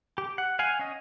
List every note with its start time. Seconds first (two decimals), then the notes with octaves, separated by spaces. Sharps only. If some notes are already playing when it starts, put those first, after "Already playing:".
0.18 G4
0.38 F#5
0.59 F5 F#5 G#5
0.79 C#4 D#5